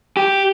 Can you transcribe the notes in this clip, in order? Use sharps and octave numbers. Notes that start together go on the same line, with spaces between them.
G4